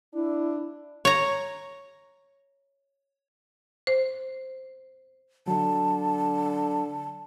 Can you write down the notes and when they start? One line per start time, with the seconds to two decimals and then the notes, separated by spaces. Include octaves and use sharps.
0.14 D4 E4
1.05 C#5 A#5
3.87 C5
5.48 D3 F#3 A5